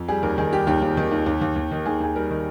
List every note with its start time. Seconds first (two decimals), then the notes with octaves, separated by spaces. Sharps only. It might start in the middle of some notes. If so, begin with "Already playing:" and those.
Already playing: F2
0.08 G3 G#4
0.23 D#2 A#4
0.38 D#3 G#4
0.53 G3 G4
0.67 D#2 G4
0.82 D#2
0.97 D#3
1.12 D#2
1.26 D#2
1.42 D#2
1.56 D#2
1.71 D#3
1.86 D#2 G#4
2.01 D#2 G#4
2.15 G3 A#4
2.31 D#3